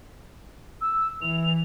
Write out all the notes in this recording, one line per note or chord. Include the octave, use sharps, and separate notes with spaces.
E6
E3 F7